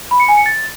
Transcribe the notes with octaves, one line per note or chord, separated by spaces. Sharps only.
B5
C#7
G#5
C#7
A6